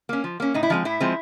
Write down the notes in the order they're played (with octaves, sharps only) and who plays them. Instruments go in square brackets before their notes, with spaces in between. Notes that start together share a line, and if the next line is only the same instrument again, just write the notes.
[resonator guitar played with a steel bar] A#3 C#4
F3
A#3 C#4
A2 D#4
E4
F3 G#3 C4 D#4
A2 E4
F3 G#3 C4